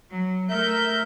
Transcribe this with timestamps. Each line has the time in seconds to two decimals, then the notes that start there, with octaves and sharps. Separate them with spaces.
0.10 F#3
0.50 A3 A#4 E5 G6